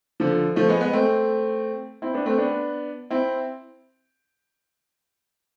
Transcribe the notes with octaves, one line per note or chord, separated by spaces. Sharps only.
D3 F3
F3 A3
G#3 B3
G#3 B3
A3 C4
C4 E4
B3 D4
A3 C4
B3 D4
C4 E4